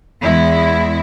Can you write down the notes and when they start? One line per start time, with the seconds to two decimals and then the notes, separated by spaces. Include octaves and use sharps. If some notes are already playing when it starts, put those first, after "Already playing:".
0.23 E2 G#3 E4